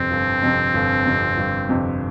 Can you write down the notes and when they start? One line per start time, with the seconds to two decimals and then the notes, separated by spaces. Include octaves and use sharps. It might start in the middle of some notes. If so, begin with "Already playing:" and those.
Already playing: G1 F2 C3 C4
0.11 G1
0.43 F2 C3
0.74 G1
1.06 F2 C3
1.38 G1
1.69 F2 C3